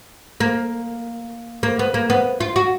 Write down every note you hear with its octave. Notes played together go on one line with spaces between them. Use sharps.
A#3
A#3
B3
A#3
B3
F4
F#4